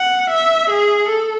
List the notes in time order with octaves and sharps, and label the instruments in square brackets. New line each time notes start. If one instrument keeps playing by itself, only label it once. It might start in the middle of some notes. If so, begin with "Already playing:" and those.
Already playing: [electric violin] F#5
E5
G#4
A4